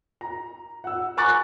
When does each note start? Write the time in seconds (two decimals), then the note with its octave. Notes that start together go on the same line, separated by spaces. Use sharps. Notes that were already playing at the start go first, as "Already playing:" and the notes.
0.21 A#5
0.84 F#5 E6
1.17 G#5 A#5 C#6 D6 F#6 A6